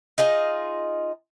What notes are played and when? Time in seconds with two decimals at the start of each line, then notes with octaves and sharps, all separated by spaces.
0.18 D#4 F4 G#4 D#5